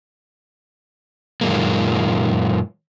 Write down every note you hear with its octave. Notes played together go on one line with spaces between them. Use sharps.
F#2 A#2 D#3 G#3 A#3